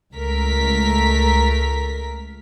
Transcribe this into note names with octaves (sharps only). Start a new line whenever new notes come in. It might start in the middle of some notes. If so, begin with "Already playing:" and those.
C#2 A3 A#4 B6